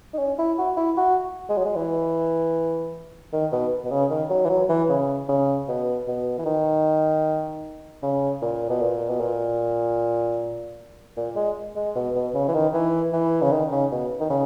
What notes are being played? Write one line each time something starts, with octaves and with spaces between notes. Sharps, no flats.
D#4
C#4
E4
F#4
E4
F#4
G#3
F#3
G#3
E3
D#3
B2
B2
C#3
D#3
F#3
E3
F#3
E3
C#3
C#3
B2
B2
E3
D#3
C#3
A#2
B2
A#2
B2
A#2
A#2
G#3
G#3
B2
B2
C#3
E3
D#3
E3
E3
C#3
D#3
C#3
B2
D#3
C#3